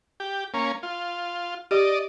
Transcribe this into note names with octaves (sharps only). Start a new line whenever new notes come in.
G4
A#3 C#4
F4
G4 D5 D#5